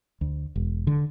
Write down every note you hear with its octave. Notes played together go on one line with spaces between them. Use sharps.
D2
E1
D3